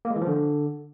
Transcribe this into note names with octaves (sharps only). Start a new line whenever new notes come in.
A#3
G#3
E3
F3
D3